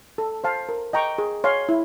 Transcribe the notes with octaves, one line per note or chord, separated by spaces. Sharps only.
A4
C5 F5 A5
A#4
D#5 G5 A#5 C#6
G#4
C#5 F5 G#5 C6
E4